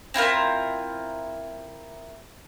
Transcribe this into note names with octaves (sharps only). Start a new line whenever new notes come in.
C4 E4 F4 A#4